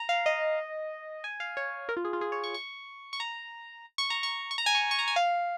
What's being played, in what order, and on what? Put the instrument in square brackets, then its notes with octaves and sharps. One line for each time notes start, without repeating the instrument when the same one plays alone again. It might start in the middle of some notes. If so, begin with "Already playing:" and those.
Already playing: [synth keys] A#5
F5
D#5
G#5
F5
C#5
A#4
F4
G#4
F4
G#4
C#5
C#6
C#6
C#6
A#5
C#6
A#5
C#6
C#6
A#5
G#5
C#6
C#6
A#5
G#5
F5